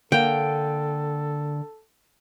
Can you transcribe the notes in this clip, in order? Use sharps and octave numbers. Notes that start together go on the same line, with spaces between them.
D3 A#3 A4 G5